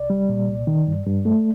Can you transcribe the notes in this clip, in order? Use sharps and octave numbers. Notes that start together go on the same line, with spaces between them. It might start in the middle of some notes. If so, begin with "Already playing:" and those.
Already playing: C2 D5
G3
A#2
C2
D#3
G2
G2
A3